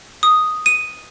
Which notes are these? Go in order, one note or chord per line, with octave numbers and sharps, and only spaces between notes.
D#6
D#7